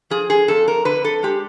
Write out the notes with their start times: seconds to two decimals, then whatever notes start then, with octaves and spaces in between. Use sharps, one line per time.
0.10 F3 G#4
0.30 G#4
0.48 F2 A4
0.68 A#4
0.85 D3 B4
1.04 A4
1.23 G#3 G4